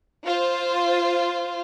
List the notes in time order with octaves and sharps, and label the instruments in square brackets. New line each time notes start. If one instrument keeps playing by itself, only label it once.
[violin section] F4 C5